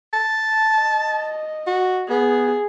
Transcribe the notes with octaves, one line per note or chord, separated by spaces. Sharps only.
A5
D#5
F#4
B3 G#4